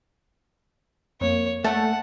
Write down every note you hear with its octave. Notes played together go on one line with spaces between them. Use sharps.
F2 A#3 C#5
A3 F#5 A5